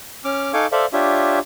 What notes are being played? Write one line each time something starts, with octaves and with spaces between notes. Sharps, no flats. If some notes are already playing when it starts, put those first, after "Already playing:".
C#4 D6 F6
D#4 A4 F5 G#5 C#6 D6
A4 C5 D5 E5 F5
D4 F4 G4 C#5 E5